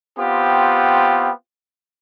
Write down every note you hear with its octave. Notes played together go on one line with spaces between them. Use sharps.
B3 C4 F4 G4